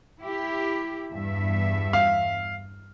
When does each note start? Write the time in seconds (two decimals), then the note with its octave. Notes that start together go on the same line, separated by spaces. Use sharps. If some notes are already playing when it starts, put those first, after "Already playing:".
0.21 E4 G4
1.11 E2 G2 E5
1.93 F5